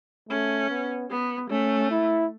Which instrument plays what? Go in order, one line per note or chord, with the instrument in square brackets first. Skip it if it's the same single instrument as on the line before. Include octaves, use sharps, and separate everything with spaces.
[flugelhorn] A3 [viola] C#4
[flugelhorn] B3
[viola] B3
[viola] A3 [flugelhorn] C#4
[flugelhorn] E4